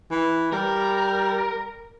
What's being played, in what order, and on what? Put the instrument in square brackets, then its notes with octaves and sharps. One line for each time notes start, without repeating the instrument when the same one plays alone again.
[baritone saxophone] E3
[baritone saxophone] G3 [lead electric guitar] A#4